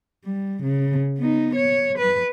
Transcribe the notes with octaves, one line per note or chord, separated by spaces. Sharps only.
G3
C#3
B3 D#4
C#5
B4